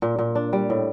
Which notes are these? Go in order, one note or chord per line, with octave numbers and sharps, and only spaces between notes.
A#2
A#2
D4
G3
A2